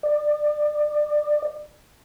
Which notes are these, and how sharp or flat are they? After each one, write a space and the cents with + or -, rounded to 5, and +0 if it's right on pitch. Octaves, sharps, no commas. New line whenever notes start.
D5 +25